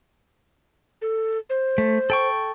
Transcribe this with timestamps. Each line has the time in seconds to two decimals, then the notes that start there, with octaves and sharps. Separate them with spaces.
1.02 A4
1.50 C5
1.78 A3
2.10 A4 G5 C#6